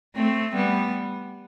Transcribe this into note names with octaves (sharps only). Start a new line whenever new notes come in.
A3 C4
G3 B3